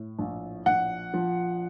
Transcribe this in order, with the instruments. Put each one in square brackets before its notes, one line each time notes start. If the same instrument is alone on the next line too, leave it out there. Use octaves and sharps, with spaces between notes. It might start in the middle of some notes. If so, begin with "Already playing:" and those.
Already playing: [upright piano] A2
A#1
A#1 F#5
F3